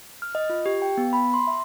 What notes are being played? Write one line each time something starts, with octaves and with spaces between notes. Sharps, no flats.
F6
D#5
F4
G4
G5
B3
B5
C6
E5